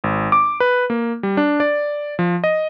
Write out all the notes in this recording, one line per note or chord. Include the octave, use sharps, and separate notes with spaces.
G#1
D6
B4
A#3
G3
D4
D5
F3
D#5